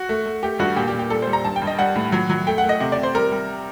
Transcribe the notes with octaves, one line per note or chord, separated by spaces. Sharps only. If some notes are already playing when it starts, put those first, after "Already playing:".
Already playing: F#4
A3
A3
A3 G4
G2 F#4
A#2 G4
G4
A#2
G4
G3 A4
C5
G3
A#5
G2 A5
G5
G2
D#5
G3 F#5
A2
F#3
F#3
A3 G5
F#5
A3
D#5
C3
D5
C3
C5
G3 A#4
G3